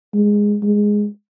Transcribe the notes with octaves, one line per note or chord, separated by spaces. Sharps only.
G#3
G#3